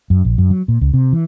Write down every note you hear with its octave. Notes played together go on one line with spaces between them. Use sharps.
F#2
A#1
F#2
F#3
A#2
C#2
C3
E3